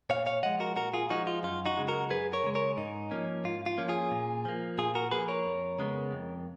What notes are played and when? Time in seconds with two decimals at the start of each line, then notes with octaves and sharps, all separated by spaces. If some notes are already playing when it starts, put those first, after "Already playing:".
0.10 A#2 C#5 F5
0.26 C#5 F5
0.43 F3 G#3 D#5 F#5
0.60 F#4 A#4
0.76 A#2 F#4 A#4
0.94 F4 G#4
1.10 F3 G#3 D#4 F#4
1.27 F4
1.43 F#2 F4
1.66 D#4 F#4
1.77 C#3 G#3
1.88 F#4 A#4
2.10 F#2 G#4 B4
2.33 A#4 C#5
2.44 C#3 G#3
2.55 A#4 C#5
2.77 G#2 D#4
3.11 F3 A#3 C#4
3.44 G#2 F4
3.66 F4
3.78 F3 A#3 C#4
3.89 F4 G#4
4.11 A#2
4.45 F3 A#3
4.78 A#2 F4 G#4
4.95 F#4 A#4
5.11 F3 A#3 G#4 B4
5.28 A#4 C#5
5.46 F2
5.79 C#3 G#3 B3
6.12 F2